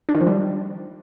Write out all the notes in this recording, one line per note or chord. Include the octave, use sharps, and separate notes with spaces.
D4
D#3
F3
G3